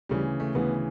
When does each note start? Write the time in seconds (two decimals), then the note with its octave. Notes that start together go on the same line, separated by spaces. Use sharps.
0.09 D2 C#3 E3 G3
0.40 A3
0.54 D2 C#3 E3 B3